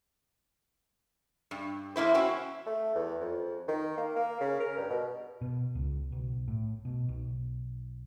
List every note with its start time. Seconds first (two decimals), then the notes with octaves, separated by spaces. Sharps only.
1.51 G2
1.96 E2 A#3 E4 C5
2.14 C4 C#4 E4 F#4
2.67 A3
2.95 E2
3.21 F2
3.68 D#3
3.98 A#3
4.16 A#3
4.41 C#3
4.60 A#4
4.78 G2
4.90 B2
5.41 B2
5.75 C#2
6.12 B1
6.48 A2
6.85 B2
7.09 B1